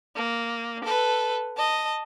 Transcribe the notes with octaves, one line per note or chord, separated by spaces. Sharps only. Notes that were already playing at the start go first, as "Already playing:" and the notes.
A#3
A4 B4
D#5 A5